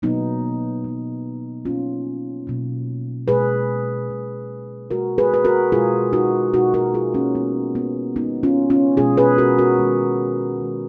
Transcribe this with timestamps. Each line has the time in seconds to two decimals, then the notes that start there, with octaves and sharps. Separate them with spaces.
0.02 B2 F#3 A#3 B3 D#4
0.84 B2 F#3 A#3
1.65 B2 F#3 A#3 C#4 F4
2.47 B2 F#3 A#3
3.28 B2 G#3 G#4 B4
4.10 B2 G#3
4.91 B2 G#3 F#4 A#4
5.18 G#4 B4
5.34 B4
5.45 F#4 A#4
5.72 B2 G#3 F4 G#4
6.13 D#4 F#4
6.53 B2 G#3 D#4 F#4
6.74 F#4 A#4
6.94 F4 G#4
7.14 A#3 C#4
7.35 B2 G#3 B3
7.75 B3
8.16 B2 G#3 B3 D#4
8.43 C#4 F4
8.70 C#4 F4
8.97 B2 G#3 F4 G#4
9.18 G#4 B4
9.38 F#4 A#4
9.58 F#4 A#4
9.79 D#3 G#3
10.60 D#3 G#3